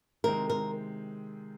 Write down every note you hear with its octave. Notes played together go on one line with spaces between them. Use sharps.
C3 D#3 G#3 C4 A#4
A#4